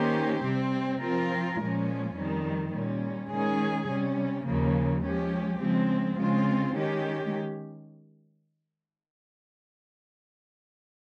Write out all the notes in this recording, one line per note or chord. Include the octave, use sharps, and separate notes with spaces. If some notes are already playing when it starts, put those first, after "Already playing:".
Already playing: D#3 A#3 C#4 G4 C5
C3 G3 C4
F3 C4 F4 A#4
A#2 F3 G#3 C#4
F2 D#3 G3
A#2 G3 C#4
D#3 G#3 C#4 G#4
C3 G3 C#4
D#2 C#3 F3 A#3
F3 G#3 C#4 G4
C#3 F3 G#3 C4
C#3 G#3 C4 F4
D#3 G#3 C#4 G4